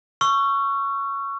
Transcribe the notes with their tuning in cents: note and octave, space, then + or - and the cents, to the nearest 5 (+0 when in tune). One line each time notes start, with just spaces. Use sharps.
C#6 +0 E6 +45